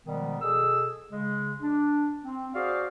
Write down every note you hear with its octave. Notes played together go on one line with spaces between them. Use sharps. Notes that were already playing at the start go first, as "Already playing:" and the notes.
B2 D#3 F3 G3 G#3 B3
B2 G#4 A4 E6
C#3 G#3
D4
C4
F#4 G#4 C5 D5 F5